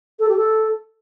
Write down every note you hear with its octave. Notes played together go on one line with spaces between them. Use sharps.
A4
G4
A4